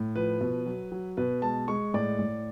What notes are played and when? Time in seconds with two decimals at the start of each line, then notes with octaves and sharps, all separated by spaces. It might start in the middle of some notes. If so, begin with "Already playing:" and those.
Already playing: A2
0.16 F3 B4
0.41 B2
0.66 F#3
0.92 F#3
1.17 B2 B4
1.42 G#3 A5
1.68 G#3 C#6
1.94 A2 D5
2.19 A2